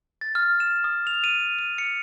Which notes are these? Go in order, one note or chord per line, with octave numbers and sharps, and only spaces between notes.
A6
F6
E7
D#6
F7
D#7
D#7
C#7